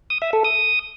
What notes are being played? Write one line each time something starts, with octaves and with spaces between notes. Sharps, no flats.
D#6
E5
A4
D#6